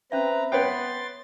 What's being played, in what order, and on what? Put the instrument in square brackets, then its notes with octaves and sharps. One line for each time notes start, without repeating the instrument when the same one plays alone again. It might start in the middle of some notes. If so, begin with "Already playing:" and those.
[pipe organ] C4 A#5 [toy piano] C#4 E5 [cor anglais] B4
[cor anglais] B3 [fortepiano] B4 C#5 G5 [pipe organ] C6 A6